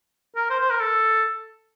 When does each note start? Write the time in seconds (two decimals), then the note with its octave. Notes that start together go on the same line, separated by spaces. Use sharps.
0.36 A#4
0.50 C5
0.60 C5
0.70 A#4
0.80 A4